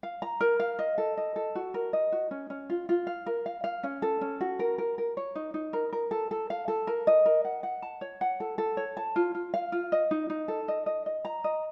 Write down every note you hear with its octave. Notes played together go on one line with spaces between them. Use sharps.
F5
A#5
A#4
F5
D#5
A4
D#5
A4
F#4
A#4
D#5
F#4
C#4
C#4
F4
F4
F5
A#4
F5
F5
C#4
A4
C#4
F#4
A#4
A#4
A#4
C#5
D#4
D#4
A#4
A#4
A4
A4
F5
A4
A#4
D#5
A#4
F#5
F#5
A5
C#5
F#5
A4
A4
C#5
A5
F4
F4
F5
F4
D#5
D#4
D#4
A4
D#5
D#5
D#5
A#5
D#5